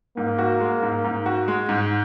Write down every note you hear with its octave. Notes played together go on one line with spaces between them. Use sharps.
G#2 A#3
F#4
G#3
G#2
G#2
F#4
G#3
G#2